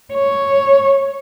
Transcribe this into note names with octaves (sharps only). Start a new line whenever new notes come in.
C#5